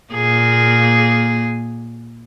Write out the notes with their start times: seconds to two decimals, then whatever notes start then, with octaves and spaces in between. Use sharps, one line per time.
0.14 A#2 A#3 G#4